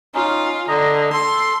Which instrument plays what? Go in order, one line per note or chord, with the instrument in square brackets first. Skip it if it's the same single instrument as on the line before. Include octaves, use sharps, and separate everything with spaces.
[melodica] C#4 D#4 [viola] F4
[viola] D3 [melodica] D#5 A#5
[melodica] A4 [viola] C6